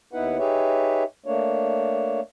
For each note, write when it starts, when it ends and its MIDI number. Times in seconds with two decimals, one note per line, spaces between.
0.13 0.38 39
0.13 0.38 59
0.13 0.38 63
0.13 0.38 64
0.13 0.38 71
0.13 0.38 78
0.39 1.04 63
0.39 1.04 67
0.39 1.04 68
0.39 1.04 71
0.39 1.04 73
0.39 1.04 76
1.26 2.21 57
1.26 2.21 58
1.26 2.21 62
1.26 2.21 73